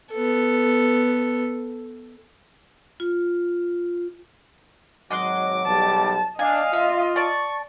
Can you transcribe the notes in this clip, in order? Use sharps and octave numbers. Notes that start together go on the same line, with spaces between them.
B3 A4
F4
G#1 F#3 D#5 C6 D6 F#6
B1 G3 A5
D4 D#5 F5 G#5
F4 E5
D5 A5 C#6